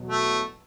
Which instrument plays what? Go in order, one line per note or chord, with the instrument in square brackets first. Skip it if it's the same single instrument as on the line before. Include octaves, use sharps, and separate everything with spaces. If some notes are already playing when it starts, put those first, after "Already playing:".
Already playing: [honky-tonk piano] E2 B2 F#3
[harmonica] A3